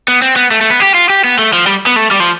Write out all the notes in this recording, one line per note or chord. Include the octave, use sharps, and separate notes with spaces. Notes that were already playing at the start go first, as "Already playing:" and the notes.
B3
C4
B3
A3
A3
B3
G4
F4
G4
B3
A3
F3
G3
B3
A3
G3
F3